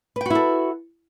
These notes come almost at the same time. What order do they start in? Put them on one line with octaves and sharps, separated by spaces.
B4 G5 F#4 E4 A4